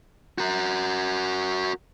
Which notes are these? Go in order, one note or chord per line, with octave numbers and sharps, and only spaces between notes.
F#4 A#4